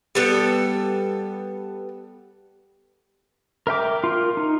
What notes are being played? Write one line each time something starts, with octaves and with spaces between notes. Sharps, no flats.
G3 B3 A4
A#4 E5 G5 D6
F4 A#4
D#4